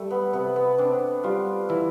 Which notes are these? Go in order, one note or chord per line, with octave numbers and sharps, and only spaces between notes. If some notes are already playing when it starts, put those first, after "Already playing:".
Already playing: G3 A3
B3
C3 B3
B3
C4 D4
G3 F4
E3 E4